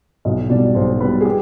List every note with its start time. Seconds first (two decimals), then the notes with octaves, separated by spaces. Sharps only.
0.25 B1 D#5
0.49 B2 G3 D5
0.75 B1 C5
1.00 B2 G3 B4
1.21 G#4
1.25 G4